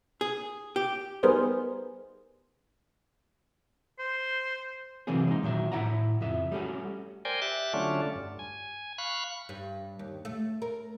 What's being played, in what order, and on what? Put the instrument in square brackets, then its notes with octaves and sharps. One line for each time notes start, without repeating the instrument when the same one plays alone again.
[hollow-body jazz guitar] G#4
G4
[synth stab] G3 B3 D#4 G#4 A#4 C5
[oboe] C5
[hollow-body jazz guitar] C3 E3 F#3 A#3 C4 G#4
G#3 D#4
A#2 D#3 F#3 E5
A2 E4 E5 F#5 A#5
F2 C#3 E5
G3 A3 C#4 F#4
[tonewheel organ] A#4 C5 D5 G5 G#5
G4 E5 F#6 A6
D3 F#3 A3 C#4 D4 F4
G2
G#5
F5 B5 C#6 F#6
[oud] G2
D#2
A3
A#4